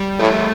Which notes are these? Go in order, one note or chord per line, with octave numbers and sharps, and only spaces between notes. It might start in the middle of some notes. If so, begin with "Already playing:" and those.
Already playing: G3
A2 A3